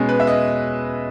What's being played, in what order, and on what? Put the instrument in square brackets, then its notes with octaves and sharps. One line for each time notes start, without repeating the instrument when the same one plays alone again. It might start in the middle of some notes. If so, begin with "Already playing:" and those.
Already playing: [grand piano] B2 G#3 C#4
B4
E5
D#5